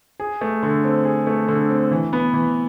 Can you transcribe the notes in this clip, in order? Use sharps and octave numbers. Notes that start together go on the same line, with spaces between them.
G#4
A3
D3
C4
G#4
A3
D3
C4
E3
B3
E3